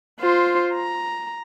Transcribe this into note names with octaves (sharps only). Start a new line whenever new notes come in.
F4 C5
A#5